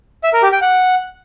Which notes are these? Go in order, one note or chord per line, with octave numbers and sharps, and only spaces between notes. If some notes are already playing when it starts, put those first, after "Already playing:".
E5
A#4
G4
G5
F#5